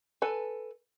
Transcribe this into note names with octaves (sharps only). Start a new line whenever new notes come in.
A4 B4 G#5